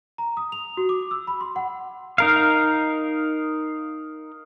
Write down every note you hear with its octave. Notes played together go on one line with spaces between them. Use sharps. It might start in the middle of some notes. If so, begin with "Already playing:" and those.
A#5
D#6
F7
F#4
D6
E6
B5
C6
F#5
D#4 A#4 F5